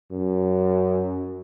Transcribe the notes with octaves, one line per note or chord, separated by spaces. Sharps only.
F#2